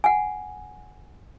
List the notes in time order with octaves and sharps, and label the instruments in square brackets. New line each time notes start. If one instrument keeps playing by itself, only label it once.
[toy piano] F#5 G#5